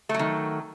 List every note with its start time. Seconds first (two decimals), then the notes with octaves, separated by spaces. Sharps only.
0.09 A3
0.14 F#3
0.19 D#3